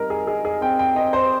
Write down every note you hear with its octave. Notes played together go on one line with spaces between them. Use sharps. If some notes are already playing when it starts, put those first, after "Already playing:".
Already playing: G3 C4 D#4 A#4 A#5
G#4
D#4 G#4
G#4
C4 G5
G5
C4 D#5
C5